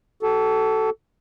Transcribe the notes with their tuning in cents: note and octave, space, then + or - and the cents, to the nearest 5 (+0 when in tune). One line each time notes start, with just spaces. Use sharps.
F#4 +40 A4 +0